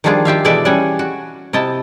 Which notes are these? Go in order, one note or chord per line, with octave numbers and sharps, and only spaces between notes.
D#3 F3 G3 D4 F4 G#4
F4 G4 E5 F5
B2 E3 G#3 A4 D5 E5
G3 C#4 F#5 G#5
F#4
C3 E4 D#5 A5